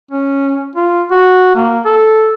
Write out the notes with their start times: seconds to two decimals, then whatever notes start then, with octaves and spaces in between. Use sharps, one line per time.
0.11 C#4
0.76 F4
1.11 F#4
1.56 A#3
1.85 A4